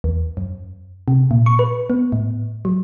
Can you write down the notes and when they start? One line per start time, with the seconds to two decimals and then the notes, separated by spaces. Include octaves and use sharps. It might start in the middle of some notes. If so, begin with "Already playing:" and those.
0.04 E2
0.37 F#2
1.08 C3
1.31 A#2
1.46 C#6
1.59 B4
1.90 B3
2.12 A2
2.65 F#3